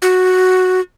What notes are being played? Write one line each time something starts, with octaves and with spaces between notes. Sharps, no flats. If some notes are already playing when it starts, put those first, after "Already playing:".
F#4